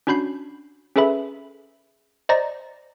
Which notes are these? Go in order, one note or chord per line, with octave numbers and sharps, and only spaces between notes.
C#4 D4 F#4 B5 G6 C7
C#4 G#4 A4 B4 E5 B5
C5 D5 D#5 A#5 A#6